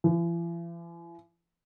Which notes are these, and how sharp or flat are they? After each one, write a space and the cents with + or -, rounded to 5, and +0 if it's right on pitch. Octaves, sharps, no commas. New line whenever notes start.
E3 +45